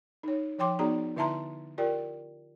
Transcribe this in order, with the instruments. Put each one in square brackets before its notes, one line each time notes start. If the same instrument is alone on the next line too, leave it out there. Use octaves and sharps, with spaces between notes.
[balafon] D#4 C#5
F3 C#5 G5 C6 D6
B3 D#4 F#4 G#4 D5 A#5
D3 E4 E5 A5 A#5 C6
F4 G4 A#4 D5 G5